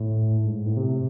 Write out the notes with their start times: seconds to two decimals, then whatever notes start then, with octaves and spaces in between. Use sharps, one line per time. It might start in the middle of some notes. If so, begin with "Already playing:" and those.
Already playing: A2
0.43 G#2
0.54 G#2
0.66 A2
0.77 C3